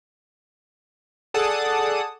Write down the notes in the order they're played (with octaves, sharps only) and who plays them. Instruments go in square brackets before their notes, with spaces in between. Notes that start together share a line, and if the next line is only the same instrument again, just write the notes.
[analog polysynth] G#4 A4 D5 F#5 A5 D#6